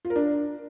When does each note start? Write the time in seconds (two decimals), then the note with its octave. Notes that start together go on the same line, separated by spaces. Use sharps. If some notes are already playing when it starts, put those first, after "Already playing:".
0.05 F4
0.10 A#4
0.16 D4